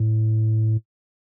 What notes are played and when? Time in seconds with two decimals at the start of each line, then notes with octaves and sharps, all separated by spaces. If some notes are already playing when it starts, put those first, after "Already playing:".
Already playing: A2